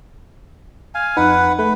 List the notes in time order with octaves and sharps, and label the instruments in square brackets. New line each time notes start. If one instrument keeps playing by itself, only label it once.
[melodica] F5 G#5
[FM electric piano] F2 D#4 [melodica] B4 F#5
[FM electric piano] A3 [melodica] B4